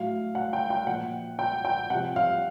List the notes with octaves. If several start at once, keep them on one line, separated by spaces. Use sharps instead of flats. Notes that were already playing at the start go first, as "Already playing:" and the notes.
Already playing: A2 F#3 F5
F#5
G5
G5
A#2 F3 F#5
G5
G5
C3 F3 F#5
F5